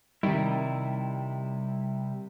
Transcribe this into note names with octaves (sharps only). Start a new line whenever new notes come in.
C3 D#3 G3 E4